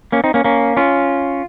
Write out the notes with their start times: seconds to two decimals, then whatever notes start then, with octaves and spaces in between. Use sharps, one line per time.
0.12 A#3 C#4
0.24 C4 D#4
0.34 A#3 C#4
0.44 A#3 C#4
0.77 C#4 F4